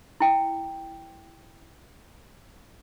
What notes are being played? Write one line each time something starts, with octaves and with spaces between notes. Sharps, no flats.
E4 G5